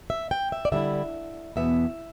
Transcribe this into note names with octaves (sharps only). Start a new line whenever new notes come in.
E5
G5
E5
D5
D3 G3 E4 E5
E2 B2 B3 E5